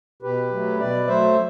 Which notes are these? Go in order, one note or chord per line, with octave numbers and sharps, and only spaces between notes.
B2 G4 B4
F#3 A3
B2 B4 D5
F#3 A3 C5 E5